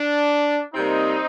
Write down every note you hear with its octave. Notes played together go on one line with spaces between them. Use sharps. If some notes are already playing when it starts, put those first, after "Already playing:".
Already playing: D4
C3 G3 A#3 C4 D#4